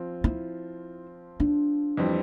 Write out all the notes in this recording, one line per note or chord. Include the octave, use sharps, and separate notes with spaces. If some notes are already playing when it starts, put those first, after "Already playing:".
Already playing: F3 C4 F4
E4
D4
F2 E3 G3 C4